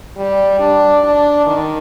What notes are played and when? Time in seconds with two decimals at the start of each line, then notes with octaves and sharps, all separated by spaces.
0.17 G3
0.60 D4
1.04 D4
1.46 D#3